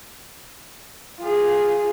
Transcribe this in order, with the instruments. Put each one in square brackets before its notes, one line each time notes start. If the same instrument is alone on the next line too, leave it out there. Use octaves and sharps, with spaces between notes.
[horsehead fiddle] F4 G#4